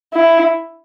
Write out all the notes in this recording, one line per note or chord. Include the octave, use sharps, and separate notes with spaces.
E4